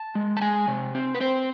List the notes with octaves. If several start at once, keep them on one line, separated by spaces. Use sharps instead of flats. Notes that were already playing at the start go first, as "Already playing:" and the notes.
Already playing: A5
G#3
A5
G#3 G#5
C3
C4
B4
C4 C5